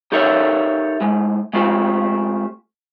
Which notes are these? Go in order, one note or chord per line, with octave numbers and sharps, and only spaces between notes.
D#4 G4 A4 A#4 C#5 E5
A2 G#3
G#3 A3 C4 F4 G4